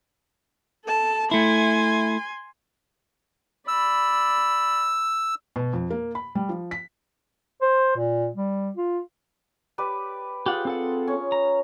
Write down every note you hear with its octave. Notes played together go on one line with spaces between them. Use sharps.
A4 A5
A3 E4 G#5 C6
D5 B5 E6
B2
F2
A#3
B5
G3
F3
B6
C5
A#2
G3
F4
G4 B4 D5
F4 G4 G#4 F#5
C4 A4 F#5
C#4
A#5